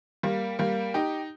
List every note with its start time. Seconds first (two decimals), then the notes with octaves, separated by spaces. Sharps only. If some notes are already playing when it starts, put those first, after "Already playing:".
0.23 G3 A#3
0.59 G3 A#3
0.94 D#4 G4